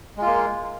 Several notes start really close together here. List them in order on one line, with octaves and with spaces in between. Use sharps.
G#3 F4 A#3